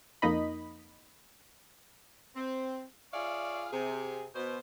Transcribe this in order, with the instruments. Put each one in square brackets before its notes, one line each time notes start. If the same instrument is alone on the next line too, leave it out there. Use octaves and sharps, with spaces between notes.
[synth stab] F2 A#3 D#4 D#5 B5
[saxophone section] C4
F4 G#4 C#5 D5 E5 F5
C3 G#4
B2 C5